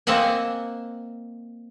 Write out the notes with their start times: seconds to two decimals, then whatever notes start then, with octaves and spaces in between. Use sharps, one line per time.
0.07 A#3 C4 D#5 E5 F#5 G#5